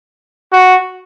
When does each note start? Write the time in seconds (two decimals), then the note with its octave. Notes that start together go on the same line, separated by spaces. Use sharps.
0.52 F#4